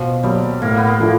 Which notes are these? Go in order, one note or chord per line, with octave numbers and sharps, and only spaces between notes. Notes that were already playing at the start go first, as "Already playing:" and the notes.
Already playing: B2 F3
F#3 G3 A#3
A2 A#3
B3
A#3
F3 A3 D4 F4